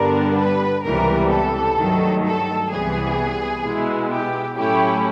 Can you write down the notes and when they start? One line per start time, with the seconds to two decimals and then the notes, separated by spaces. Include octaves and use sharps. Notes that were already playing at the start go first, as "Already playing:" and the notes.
Already playing: G2 D3 G3 B3 D4 A#4
0.39 B4
0.85 C#2 C3 E3 G3 B3 A#4
1.32 A4
1.79 G2 D#3 F#3 A3
2.25 A4
2.72 C2 C3 E3 G3 B3 G#4
3.64 B2 G#3 B3 E4
4.11 G4
4.58 A2 F#3 A3 C#4 E4 G4